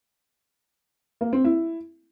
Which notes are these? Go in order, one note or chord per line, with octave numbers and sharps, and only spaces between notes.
A#3
C4
E4